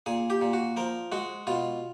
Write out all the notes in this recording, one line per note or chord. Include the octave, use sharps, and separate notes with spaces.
A#2 G#4
G4
A#2
F#4
F3 A#4
G#3 F#4
B2 F4